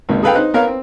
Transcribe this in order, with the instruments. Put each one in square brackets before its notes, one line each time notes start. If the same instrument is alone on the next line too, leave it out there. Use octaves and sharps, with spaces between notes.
[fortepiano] G#1 C#2 A#3 D#4
G#4 A4 B4 F5 G5
D#4 C5 F#6
B3 A#4 C#5 F5
C4